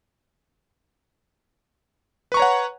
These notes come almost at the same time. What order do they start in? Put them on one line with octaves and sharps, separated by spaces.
B4 C#6 A#5 C#5 F#5